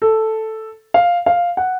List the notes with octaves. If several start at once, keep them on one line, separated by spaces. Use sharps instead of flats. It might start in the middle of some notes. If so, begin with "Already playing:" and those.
A4
F5
F5
F#5